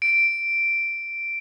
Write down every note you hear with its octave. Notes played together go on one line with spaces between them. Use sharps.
D7